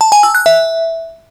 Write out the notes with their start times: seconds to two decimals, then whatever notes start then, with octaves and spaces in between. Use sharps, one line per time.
0.01 A5
0.12 G#5
0.23 E6
0.35 F#6
0.46 E5